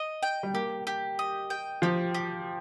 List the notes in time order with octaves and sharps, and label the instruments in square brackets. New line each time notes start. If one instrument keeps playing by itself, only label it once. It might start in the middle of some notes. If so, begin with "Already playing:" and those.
Already playing: [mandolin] D#5
G5
[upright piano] G3
[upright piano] A#3 [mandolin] G4
[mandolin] G4
D#5
G5
[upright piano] F3 [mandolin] G4
[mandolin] G4